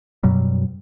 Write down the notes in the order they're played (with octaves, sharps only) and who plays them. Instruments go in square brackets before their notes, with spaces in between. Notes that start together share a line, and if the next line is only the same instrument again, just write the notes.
[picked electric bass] F#2 B2 F#3 G3